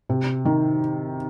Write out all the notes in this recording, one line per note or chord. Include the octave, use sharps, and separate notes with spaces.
C3
D#3